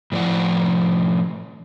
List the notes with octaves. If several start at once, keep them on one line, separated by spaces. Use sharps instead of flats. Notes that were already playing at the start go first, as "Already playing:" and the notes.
A2 F3 D5 F#5